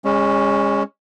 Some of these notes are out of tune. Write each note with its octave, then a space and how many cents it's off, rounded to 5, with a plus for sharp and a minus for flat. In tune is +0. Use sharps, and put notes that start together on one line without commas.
G#3 -30 C#4 +0